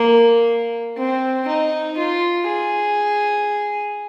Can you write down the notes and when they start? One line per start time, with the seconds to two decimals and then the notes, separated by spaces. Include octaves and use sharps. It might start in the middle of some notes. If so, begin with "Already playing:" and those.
Already playing: A#3
0.97 C4
1.48 D#4
1.97 F4
2.48 G#4